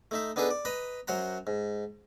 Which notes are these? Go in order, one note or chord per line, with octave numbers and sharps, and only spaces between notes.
A3 D#4 E5
B3 D4 D#4 G#4 A4 B4
D5
B4 D#5 A#5 B5
F#2 F#3 C5 F#5 A#5
G#2